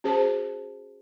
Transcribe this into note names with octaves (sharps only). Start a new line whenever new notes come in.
C#4 F#4 G#4 C5 A5